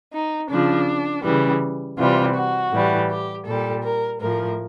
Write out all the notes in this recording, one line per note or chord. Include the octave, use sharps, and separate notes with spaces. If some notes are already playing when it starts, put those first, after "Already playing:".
D#4
C#3 F3 D4
C#3 E3 G3
C3 E3 G3 F4
F#4
A2 E3 G3
G4
A#2 G3 A4
A#4
A2 F3 A#4